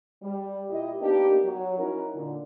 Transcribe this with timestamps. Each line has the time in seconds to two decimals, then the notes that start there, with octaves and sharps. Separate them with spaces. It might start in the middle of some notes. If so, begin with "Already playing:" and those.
0.23 G3
0.70 A#2 E4 G4 D#5
1.01 A#3 B3 D4 D#4 G4
1.45 F#3
1.78 C#4 D#4 E4 F#4 A#4
2.15 A#2 D3